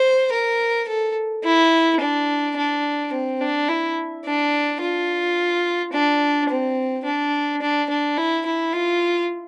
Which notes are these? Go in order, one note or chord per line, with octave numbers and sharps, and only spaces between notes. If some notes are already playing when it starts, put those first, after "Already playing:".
Already playing: C5
A#4
A4
E4
D4
D4
C4
D4
E4
D4
F4
D4
C4
D4
D4
D4
E4
E4
F4